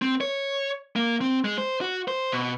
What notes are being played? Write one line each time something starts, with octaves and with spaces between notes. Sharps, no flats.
C4
C#5
A#3
C4
G#3
C5
F#4
C5
B2